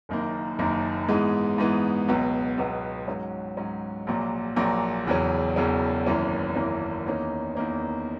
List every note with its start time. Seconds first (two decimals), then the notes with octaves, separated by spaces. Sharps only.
0.09 F#1 F#2 D#3 A#3
0.59 F#1 F#2 D#3 A#3
1.08 G#2 E3 G#3 B3
1.58 G#2 E3 G#3 B3
2.08 C#2 B2 F#3 B3
2.58 C#2 B2 F#3 B3
3.07 G#2 F#3 C#4
3.57 G#2 F#3 C#4
4.07 A#1 A#2 F#3 A#3
4.56 A#1 A#2 F#3 A#3
5.06 E1 E2 C#3 F#3 C#4
5.56 E1 E2 C#3 F#3 C#4
6.06 G#1 F#2 E3 A#3 C#4
6.55 G#1 F#2 E3 A#3 C#4
7.06 E2 D#3 A#3 C#4
7.55 E2 D#3 A#3 C#4